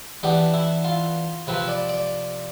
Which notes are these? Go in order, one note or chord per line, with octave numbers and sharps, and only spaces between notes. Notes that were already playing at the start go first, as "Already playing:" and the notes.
E3 B3 D4 G4
E4
F4
C3 F3 C4 B4
D5
D5